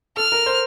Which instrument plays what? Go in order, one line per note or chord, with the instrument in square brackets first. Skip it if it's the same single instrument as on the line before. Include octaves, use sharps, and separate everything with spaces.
[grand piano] A4 [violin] F6
[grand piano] A#4
C5